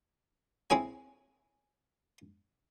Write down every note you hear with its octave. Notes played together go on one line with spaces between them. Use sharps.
C4 E4 G#4 C#5 G#5